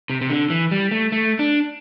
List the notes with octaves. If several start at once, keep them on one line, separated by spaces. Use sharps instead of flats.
C3
C3
D3
E3
G3
A3
A3
D4